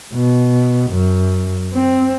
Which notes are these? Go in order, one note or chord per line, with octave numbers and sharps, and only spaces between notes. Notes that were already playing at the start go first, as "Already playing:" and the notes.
B2
F#2
C4